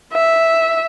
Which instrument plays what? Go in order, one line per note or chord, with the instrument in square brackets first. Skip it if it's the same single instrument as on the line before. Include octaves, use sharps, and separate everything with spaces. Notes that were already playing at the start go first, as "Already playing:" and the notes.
[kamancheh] E5